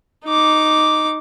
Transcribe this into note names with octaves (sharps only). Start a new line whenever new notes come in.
D#4 D6